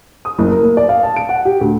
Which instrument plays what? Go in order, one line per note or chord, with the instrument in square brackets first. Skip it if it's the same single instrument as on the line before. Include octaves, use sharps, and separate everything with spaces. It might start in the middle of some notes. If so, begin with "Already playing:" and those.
[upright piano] D#6
F#1
A#4
A#3
D5
F5
A5
D7
F#5
G4
D2